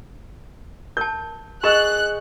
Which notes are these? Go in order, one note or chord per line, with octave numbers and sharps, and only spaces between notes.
A#4 A5 G6
G#4 A#4 D#5 C#6 E6 F#6 E7